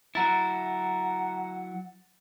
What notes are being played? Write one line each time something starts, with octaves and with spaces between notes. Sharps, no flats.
F#3 E4 F#5 A#5 A6